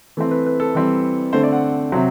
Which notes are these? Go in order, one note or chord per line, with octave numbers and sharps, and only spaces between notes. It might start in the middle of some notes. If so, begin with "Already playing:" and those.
E3 A3 C4
B4
B4
A4
E3 G3 C4
D3 A3 C4 C5
D5
F#5
C3 F#3 C4